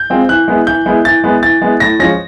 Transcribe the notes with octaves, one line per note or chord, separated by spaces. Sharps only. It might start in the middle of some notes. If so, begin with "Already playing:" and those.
Already playing: G6
G#3 C4 F4
E3 F#6
G#3 B3 E4
E3 G6
G#3 B3 E4
E3 A6
G#3 B3 E4
E3 A6
G#3 B3 E4
A2 A#6
F3 G#3 C#4 A#6